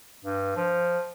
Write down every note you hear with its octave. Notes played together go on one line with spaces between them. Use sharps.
G2
F3